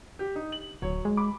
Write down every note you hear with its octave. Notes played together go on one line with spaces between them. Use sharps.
G4
D#4
F#7
D1 F#3 C#5
G#3
B5 D6